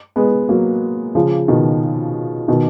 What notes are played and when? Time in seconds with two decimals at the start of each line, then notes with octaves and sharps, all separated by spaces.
0.16 G#3 B3
0.49 F#3 A#3
1.15 C#3 F3
1.48 B2 D#3
2.48 B2 D#3